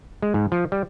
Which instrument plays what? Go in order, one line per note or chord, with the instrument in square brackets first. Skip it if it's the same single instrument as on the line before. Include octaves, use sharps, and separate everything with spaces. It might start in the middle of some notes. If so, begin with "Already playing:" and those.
[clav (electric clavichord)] G#3
G#2
F3
G3